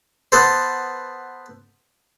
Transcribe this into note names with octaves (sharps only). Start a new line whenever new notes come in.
B3 A4 C5